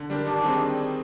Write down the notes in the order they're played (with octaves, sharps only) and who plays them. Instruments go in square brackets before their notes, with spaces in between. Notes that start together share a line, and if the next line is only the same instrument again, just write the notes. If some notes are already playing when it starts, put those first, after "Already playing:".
Already playing: [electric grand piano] D3
G3 D4 G4 A#4
[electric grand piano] D#3 [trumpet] D4
[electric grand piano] G3 C4 D#4 G#4